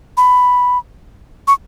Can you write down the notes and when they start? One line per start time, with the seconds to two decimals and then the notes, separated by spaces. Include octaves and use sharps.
0.17 B5
1.47 C#6